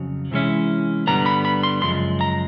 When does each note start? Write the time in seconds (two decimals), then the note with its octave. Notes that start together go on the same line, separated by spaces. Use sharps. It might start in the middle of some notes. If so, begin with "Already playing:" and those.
Already playing: F2 C#3 F#3
0.31 C3 E3 G#3 C#4 E4
1.07 G2 D3 G3 B3 A#5
1.26 B5
1.45 B5
1.63 C6
1.82 F#2 C#3 F3 G#3 C6
2.21 A#5